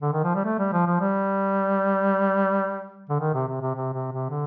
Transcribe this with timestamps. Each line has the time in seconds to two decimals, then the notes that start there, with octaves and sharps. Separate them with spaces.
0.02 D3
0.13 D#3
0.24 F3
0.35 G3
0.45 A3
0.59 G3
0.73 F3
0.87 F3
1.01 G3
3.10 D3
3.20 D#3
3.34 C3
3.48 C3
3.62 C3
3.76 C3
3.94 C3
4.12 C3
4.30 D3